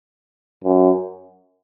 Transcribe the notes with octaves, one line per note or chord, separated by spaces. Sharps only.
F#2